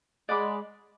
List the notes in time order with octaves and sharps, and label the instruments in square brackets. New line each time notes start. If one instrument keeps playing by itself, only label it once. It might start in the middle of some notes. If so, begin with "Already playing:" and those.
[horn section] G#3 [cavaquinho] D5 F#5 B5 D6